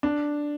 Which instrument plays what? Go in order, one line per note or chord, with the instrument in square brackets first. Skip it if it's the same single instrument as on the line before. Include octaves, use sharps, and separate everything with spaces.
[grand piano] D4